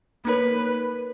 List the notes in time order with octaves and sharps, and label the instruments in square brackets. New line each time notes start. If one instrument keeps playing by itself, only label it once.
[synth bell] A#3 D#4 A#4 C#5 [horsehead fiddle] B4